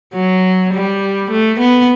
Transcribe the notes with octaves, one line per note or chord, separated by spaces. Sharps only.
F#3
G3
A3
B3